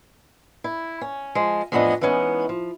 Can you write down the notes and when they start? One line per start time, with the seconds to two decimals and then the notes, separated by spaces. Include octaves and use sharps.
0.64 E4
1.01 C#4
1.35 F3 G#3
1.72 F2 A2 E3 B3 D4 D#5
2.01 E3 G#3 B3 C#4 D#4
2.49 F3